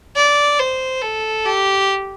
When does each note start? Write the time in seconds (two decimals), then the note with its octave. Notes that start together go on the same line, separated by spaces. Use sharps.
0.16 D5
0.59 C5
1.02 A4
1.45 G4